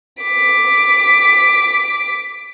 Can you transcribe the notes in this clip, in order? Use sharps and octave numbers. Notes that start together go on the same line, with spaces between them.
D6 B6